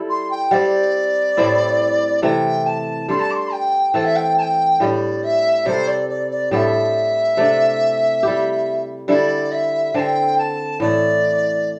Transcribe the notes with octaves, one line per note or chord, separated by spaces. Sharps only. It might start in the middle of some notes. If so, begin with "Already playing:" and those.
Already playing: G3 E4 A4
C6
G5
G3 C4 G4 D5
A2 G3 C4 E4
C3 E3 A3 G5
A5
G3 D4 A4 C6
A5
D6
C6
G5
E3 A3 C4 A4 G5
E5
G5
A5
G5
A2 G3 D4 D5 E5
E5
C3 G3 C4 A4 C5
D5
D5
D5
A2 G3 D4 A4 E5 G5
C3 A3 D4
G3 E4 G4
D3 G3 E4 A4 D5
E5
D3 C4 A4 G5 A5
A5
A2 E3 A3 D5